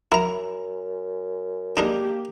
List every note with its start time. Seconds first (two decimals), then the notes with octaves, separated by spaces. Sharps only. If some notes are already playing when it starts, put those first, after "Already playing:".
0.12 F#2 E4 A#4 A#5
1.77 G#3 A#3 D4 D#4 G4 A#4